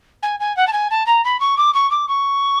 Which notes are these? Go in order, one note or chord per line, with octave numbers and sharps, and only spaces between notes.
G#5
G#5
F#5
A5
G#5
A5
A#5
B5
C#6
D6
C#6
D6
C#6